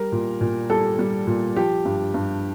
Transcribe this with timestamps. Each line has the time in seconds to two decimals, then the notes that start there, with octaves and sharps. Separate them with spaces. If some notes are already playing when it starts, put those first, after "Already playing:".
Already playing: G3 A#4
0.12 A#2
0.41 A#2
0.70 G3 A4
0.99 G3
1.27 A#2
1.56 F3 G4
1.85 G2
2.14 G2